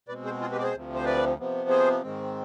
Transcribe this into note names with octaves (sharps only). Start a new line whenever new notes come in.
B2 G#3 C4 B4 D5
G#4 C5
F4 G#4
G4 B4
D5
G#4 C5
D2 C3 F3
C5
B4 D5
C3 F3 B3
G#4 C5
G#2 D#3 G#3 C4